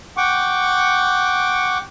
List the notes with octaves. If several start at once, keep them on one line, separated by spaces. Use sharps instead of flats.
F#5 G5 C#6 D6